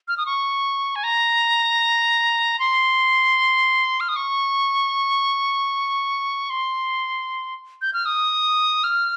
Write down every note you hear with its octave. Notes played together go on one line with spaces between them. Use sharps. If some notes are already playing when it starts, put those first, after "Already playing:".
F6
D#6
C#6
G#5
A#5
C6
F6
D#6
C#6
C6
G6
F6
D#6
F6